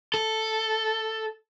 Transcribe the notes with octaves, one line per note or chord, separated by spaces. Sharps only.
A4